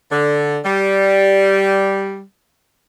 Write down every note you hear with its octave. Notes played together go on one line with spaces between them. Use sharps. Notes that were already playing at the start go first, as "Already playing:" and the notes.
D3
G3